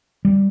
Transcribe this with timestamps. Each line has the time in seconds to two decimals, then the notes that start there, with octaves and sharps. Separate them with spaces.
0.25 G3